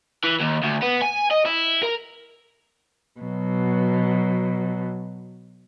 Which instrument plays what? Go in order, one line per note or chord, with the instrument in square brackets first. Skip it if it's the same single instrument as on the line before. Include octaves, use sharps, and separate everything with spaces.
[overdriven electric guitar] E3
D#2
D2
B3
G#5
D#5
E4
A#4
[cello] B2 F#3